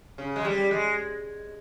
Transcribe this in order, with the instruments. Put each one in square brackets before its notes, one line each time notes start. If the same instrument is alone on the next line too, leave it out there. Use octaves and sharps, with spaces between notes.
[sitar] C#3
G#3
G3
G#3